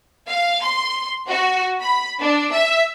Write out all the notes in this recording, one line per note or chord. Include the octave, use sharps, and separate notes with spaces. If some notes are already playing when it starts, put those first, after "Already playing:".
F5
C6
F#4
B5
D4
E5